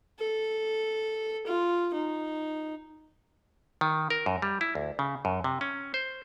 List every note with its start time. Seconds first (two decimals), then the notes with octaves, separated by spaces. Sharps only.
0.19 A4
1.47 F4
1.94 D#4
3.81 D#3
4.10 A#4
4.26 F#2
4.42 G3
4.61 E4
4.75 D2
4.99 C#3
5.25 F#2
5.44 C3
5.61 C#4
5.94 C5